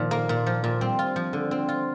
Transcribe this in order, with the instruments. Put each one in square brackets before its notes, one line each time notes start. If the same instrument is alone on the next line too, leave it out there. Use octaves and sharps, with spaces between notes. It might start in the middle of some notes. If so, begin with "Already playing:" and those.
Already playing: [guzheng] A#2 F3 [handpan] D#3
[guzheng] A#3
A#2
F3
A#2
[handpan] G3 [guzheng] C4
[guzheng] F4
F3
D3
C4
F4